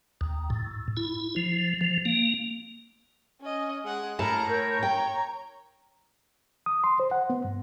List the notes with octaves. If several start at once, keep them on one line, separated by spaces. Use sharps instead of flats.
D#2
A2
E4
F3
F3
A#3
C#4 D#5
G#3 F#5
A2 E4 A#4 A5 A#5
A#4 C#5 G6
G5 A#5
D#6
C6
C5
F#5
B3
G2